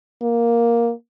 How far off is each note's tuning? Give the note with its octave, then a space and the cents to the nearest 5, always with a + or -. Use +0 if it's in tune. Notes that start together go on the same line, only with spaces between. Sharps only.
A#3 +5